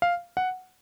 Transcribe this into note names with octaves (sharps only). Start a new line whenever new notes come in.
F5
F#5